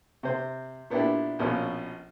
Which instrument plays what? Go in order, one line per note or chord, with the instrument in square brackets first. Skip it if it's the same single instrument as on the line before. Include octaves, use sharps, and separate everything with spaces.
[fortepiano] C3 C5
A#2 B3 D4 E4 G4
A#1 B2 F3 C#4 F4